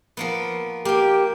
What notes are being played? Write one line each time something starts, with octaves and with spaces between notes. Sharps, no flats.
F3 A#3 B3
A#3 G4 G5